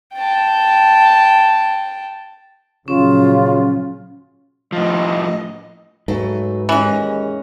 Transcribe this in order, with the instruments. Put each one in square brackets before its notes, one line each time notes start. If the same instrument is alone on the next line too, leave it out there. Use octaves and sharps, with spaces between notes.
[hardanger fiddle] G5 A5
[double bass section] A#2 F3 F#3 [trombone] C#3 [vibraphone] C#4 [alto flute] F4
[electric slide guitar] A2 F3 [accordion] D#5
[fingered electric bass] G#2 [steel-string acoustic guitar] F#3 A3 B4
[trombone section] D#2 G#3 [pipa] E3 [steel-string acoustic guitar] C#4 D#5